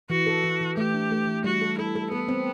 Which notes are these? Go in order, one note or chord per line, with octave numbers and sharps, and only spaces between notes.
E3 F#4
A4
E3
E3
A3 G4
D4
A3
E3
G3 F#4
A4
E4 A4
A4
B3 A4
C4